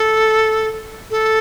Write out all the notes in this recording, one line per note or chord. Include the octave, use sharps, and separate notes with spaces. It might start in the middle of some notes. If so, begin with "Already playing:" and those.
Already playing: A4
A4